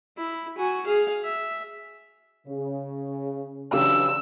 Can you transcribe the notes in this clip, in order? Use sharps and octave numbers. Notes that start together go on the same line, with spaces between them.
E4
F#4 G#5
G#4 F5
E5
C#3
C#3 E3 F#3 D4 G4 E6